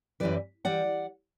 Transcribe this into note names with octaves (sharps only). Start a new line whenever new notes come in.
F#2 E3 G3 B4 D5
E3 G3 D5 F#5